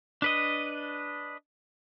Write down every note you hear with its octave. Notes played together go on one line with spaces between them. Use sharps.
D4 B4 D#5